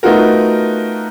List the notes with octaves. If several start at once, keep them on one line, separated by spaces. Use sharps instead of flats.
A3 B3 D#4 F4 F#4 A#4